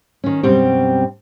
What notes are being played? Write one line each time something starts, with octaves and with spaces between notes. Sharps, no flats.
D#3 C#4
F#2 B2 G3 C4 G4